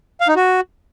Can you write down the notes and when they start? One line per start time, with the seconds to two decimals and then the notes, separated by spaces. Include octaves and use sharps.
0.21 F5
0.28 D#4
0.36 F#4